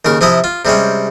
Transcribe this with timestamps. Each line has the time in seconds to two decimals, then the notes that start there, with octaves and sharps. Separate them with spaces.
0.05 D#2 C#3 A#4
0.21 C3 F3 E4 D#5 A#5
0.44 F4
0.65 C3 G3 G#3 C#4